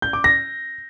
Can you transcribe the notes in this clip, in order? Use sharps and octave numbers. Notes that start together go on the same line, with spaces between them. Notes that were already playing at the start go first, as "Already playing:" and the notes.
G6
D6
A#6